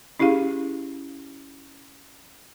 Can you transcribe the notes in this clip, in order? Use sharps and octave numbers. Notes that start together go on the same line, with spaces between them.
C#4 E4 G4 G#4 F5